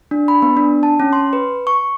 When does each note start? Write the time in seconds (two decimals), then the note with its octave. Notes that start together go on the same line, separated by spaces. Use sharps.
0.11 D4
0.28 B5
0.42 B3
0.57 D4
0.83 A5
1.00 C#4
1.13 C6
1.33 B4
1.67 C#6